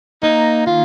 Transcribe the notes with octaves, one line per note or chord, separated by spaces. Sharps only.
A#3 D#4
D#3 F4